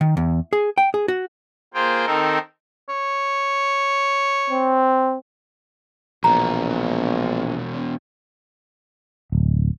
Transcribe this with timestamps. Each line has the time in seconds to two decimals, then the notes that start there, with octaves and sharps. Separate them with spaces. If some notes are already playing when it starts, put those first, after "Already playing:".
0.01 D#3
0.17 E2
0.53 G#4
0.78 G5
0.94 G#4
1.08 F#4
1.74 A#3 F4 G#4 C5 G5
2.06 D#3 C4 D#4 A4 A#4
2.89 C#5
4.50 C4
6.24 A#1 E2 B2 A#5
9.32 D1